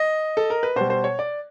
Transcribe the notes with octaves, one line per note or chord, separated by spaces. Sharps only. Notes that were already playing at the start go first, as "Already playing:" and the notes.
Already playing: D#5
A4
A#4
B4
B2 G3 C5
C5
C#5
D5